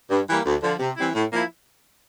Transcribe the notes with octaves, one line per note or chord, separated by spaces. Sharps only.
G2
E3 G3 A#3
D2
D3 F3
C3
E3 G3 C4 E4
A2
F3 A#3 E4